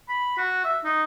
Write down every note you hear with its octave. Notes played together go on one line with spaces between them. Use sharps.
B5
F#4
E5
D#4